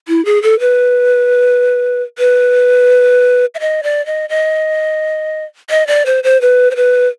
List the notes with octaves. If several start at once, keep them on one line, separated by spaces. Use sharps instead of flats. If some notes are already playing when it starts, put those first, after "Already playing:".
E4
G#4
A4
B4
B4
E5
D#5
D5
D#5
D#5
D#5
D5
C5
C5
B4
C5
B4